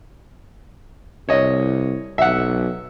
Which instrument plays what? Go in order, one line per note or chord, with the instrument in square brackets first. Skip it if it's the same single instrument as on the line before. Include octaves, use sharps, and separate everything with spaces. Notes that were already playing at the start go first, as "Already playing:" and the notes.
[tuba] C2 [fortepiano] C#5 D#5
[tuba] B1 [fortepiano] E5 F#5